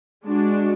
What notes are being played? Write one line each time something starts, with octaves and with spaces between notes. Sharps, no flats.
G#3 D4 F#4